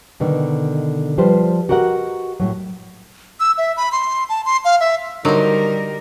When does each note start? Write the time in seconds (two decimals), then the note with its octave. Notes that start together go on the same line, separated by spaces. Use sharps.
0.20 B2 D3 D#3
1.18 F3 G3 B4 C5
1.69 F#4 G4 A#4 D#5 F#5
2.40 A2 F#3
3.40 E6
3.58 E5
3.77 B5
3.92 C6
4.29 A5
4.45 C6
4.65 F5
4.80 E5
5.25 D3 D#3 F#3 G3 D#4 A#4 C5